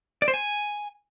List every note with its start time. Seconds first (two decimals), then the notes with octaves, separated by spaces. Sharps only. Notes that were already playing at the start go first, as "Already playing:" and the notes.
0.22 D5
0.28 C5
0.34 G#5